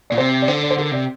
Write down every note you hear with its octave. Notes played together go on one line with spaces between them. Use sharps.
A#2 D5
C3 C5
D5
D3 C5
D5
C5
D3 A#4
C3 D5